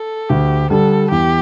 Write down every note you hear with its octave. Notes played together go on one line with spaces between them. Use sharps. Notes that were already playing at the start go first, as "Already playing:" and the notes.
Already playing: A4
D2 G4
D3 G3 D4 A4
E2 G4